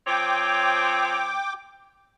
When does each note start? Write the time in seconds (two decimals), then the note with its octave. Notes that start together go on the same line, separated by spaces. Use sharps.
0.07 F3 C4 C#5 G5 D6